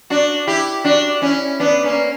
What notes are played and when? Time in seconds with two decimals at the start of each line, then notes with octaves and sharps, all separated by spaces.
0.10 D4 F#4
0.47 E4 G4
0.84 D4 F#4
1.22 C#4 E4
1.60 B3 D4
1.84 A#3 C#4